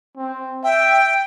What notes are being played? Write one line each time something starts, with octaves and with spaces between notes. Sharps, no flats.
C4
E5 G5